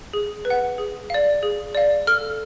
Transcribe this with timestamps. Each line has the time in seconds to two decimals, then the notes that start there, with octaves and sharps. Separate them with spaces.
0.13 G#4
0.45 B4
0.50 F#5
0.78 G#4
1.10 D5 F5
1.43 G#4
1.75 D5 F5
2.07 A4 F6